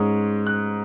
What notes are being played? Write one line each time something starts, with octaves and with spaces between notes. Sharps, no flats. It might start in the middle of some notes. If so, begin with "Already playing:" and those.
Already playing: G#2 G#3 C#4
F#6